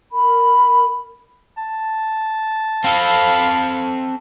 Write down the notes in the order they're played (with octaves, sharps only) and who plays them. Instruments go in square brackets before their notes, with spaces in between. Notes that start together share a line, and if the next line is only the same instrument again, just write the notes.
[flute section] A#4 B5
[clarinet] A5
[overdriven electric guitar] C4 A4 [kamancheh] F5 B5